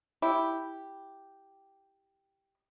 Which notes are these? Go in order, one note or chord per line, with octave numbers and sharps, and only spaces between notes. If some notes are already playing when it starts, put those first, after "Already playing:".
E4 G4